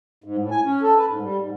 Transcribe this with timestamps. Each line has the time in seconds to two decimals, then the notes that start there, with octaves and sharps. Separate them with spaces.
0.24 G#2
0.39 A2
0.51 G#5
0.65 C#4
0.82 A4
0.97 B4
1.09 G#2
1.21 G3
1.41 G#2